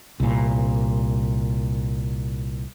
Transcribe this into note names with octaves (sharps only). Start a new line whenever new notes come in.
C2 A#2